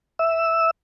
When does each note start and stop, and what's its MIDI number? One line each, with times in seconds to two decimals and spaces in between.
0.19 0.71 76
0.19 0.71 88